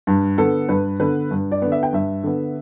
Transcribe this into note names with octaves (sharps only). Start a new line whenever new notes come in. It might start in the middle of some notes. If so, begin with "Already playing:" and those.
G2
D3 B3 A4
G2 B4
D3 B3 B4
G2
D5
D3 B3
E5
G5
G2 E5
D3 B3